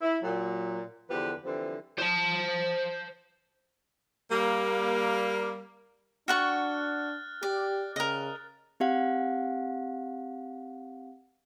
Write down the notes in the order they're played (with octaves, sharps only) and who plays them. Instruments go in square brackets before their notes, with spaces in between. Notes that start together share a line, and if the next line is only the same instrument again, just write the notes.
[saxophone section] E4
A#2 F#3
E2 D3 F3 G4 B4
D3 E3 F3 G3 C4
[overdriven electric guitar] C5 A5
[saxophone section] G3 A#3
[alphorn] D4 [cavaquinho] F#4 F#5 C#6 [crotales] F6 F#6 A6
[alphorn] G4 [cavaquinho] D5
[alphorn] C#3 [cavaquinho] A#4 D#5
[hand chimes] C4 G4 F5 F#5